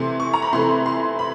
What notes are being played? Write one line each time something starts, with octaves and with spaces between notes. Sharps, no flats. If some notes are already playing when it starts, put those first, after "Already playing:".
Already playing: C3 E3 A3 C6
C#6
A#5
B5
C3 E3 A3 C6
C6
B5